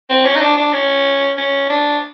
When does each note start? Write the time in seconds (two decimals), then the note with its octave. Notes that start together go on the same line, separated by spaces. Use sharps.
0.10 C4
0.25 C#4
0.35 D#4
0.41 D4
0.57 D4
0.73 C#4
1.37 C#4
1.69 D4